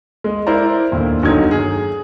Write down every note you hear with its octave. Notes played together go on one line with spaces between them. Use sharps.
G#3 D#5
E4 A#4 C5 D5 A#5
G1 D#2 A#2
G1 F#3 D#4 G#6
G#4